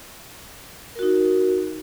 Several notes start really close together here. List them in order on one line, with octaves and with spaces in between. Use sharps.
A#4 F#4 D#4